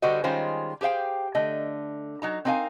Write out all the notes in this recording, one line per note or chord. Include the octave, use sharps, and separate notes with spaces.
D3 G3 D4 F#4 C5 D#5
D#3 G3 G#3 C#4 F4 C5
G4 G#4 C5 F5 G5
D3 A3 D#5
F#3 D#4 A#5
C4 D4 D#4 A#4 F5 G#5